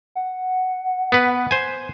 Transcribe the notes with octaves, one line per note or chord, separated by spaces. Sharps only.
F#5
B3 B4
C5 G#5